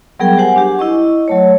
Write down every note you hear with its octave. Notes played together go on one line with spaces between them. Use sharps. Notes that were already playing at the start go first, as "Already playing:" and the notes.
F#3 G3 B3 G#4 A#4 G5
G4 C5 F#5 G#5
D4 G4
E4 D#5 C#6
F#3 A3 C#5